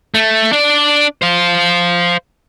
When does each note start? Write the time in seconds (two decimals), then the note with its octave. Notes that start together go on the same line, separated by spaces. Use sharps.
0.14 A3
0.53 D4 D5
1.22 C5 F5